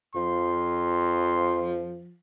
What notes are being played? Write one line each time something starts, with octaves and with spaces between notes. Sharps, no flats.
F2 F3 C6